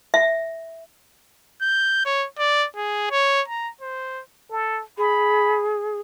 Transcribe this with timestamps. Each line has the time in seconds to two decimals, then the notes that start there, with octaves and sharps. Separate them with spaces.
0.14 E5
1.62 G6
2.05 C#5
2.39 D5
2.77 G#4
3.11 C#5
3.48 A#5
3.81 C5
4.50 A4
4.98 G#4 B5